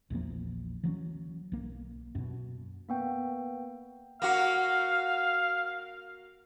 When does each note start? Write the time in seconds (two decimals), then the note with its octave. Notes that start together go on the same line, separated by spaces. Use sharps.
0.10 A#1 E2 F3 A#3
0.84 E3 F#3 G#3 C#4
1.52 B1 A#3
2.15 F#2 B2
2.89 A#3 B3 G5
4.22 A#3 F#4 F5